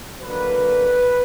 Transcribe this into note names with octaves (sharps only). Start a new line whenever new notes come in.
D3 F#3 A#3 B4